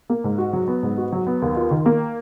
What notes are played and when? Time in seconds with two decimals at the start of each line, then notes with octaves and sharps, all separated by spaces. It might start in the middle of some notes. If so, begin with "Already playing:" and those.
0.10 A#3
0.24 G#2
0.38 F#4
0.53 F#3
0.68 B3
0.83 G#2
0.98 F#4
1.12 F#3
1.27 B3
1.42 D#2
1.56 F4
1.71 D#3
1.86 A#3